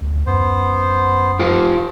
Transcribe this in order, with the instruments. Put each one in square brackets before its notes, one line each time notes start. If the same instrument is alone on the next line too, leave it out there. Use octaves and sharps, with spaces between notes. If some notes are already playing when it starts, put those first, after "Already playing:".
[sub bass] D2
[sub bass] F#2 [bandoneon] B3 C5
[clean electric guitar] F4 G4 C5